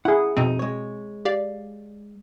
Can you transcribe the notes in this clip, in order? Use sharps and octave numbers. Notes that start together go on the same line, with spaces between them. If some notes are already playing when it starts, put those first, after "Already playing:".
E4 G#4 F#5
F2 B2 C4 D#4
G#3 C#5
G4 D5 F5